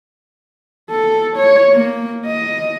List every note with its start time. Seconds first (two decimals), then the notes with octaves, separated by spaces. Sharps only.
0.91 A4
1.38 C#5
1.74 A#3
2.26 D#5